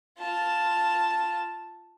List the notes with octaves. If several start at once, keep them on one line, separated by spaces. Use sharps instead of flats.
F4 A5